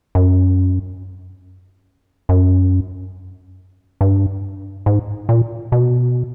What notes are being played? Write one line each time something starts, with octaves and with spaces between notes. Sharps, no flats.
F#2
F#2
G2
G#2
A#2
B2